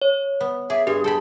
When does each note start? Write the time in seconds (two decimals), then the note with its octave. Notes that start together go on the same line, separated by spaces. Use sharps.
0.02 C#5
0.41 B3
0.70 G#4 D5 E5
0.87 G2 G4 G#4
1.04 G#4 A4 G5 B5